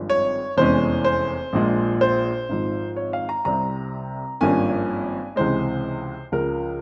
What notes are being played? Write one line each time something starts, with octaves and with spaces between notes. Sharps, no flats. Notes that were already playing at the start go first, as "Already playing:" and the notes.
Already playing: G#1 G2 F3 G#3
C#5
F1 E2 E3 G#3 C#4 C5
C5
A#1 A#2 F3 G#3
C5
G#1 G#2 F3
C#5
F5
A#5
C2 C3 G3 C4 A#5
G#1 G2 F3 A#3 C#4 G#5
C#2 C3 E3 G#3 C5
C#2 C#3 F3 A#4